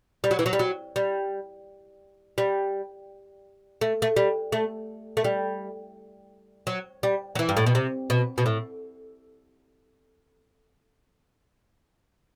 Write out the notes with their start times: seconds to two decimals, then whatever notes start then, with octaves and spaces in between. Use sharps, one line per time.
0.24 G3
0.31 F#3
0.39 E3
0.46 F#3
0.53 G3
0.59 F#3
0.96 G3
2.38 G3
3.81 A3
4.02 A3
4.16 G3
4.52 A3
5.17 A3
5.24 G3
6.67 F#3
7.03 G3
7.35 F#3
7.39 E3
7.49 G2
7.57 A2
7.66 B2
7.75 C3
8.10 B2
8.38 B2
8.46 A2